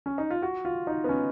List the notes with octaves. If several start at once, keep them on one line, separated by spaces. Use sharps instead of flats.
C#4
D#4
F4
F#4
F4
D#4
B3
C#4